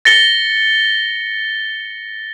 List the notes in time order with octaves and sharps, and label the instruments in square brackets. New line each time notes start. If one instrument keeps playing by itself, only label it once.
[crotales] A6 A#6 C#7 G7